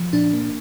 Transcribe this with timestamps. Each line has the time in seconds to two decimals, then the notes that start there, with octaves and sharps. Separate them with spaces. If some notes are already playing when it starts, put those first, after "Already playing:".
Already playing: F3
0.13 A#2 D4
0.34 A#3